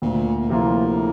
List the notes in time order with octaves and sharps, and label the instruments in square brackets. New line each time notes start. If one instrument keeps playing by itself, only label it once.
[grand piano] D2 [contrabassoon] A#2
[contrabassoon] A#2
[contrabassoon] A2 [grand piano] C3 F3 A#3 F4